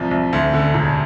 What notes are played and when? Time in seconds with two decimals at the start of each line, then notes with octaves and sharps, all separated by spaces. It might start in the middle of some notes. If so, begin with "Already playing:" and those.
Already playing: C2 C3 F3
0.11 C2
0.33 D2
0.54 D3
0.74 E1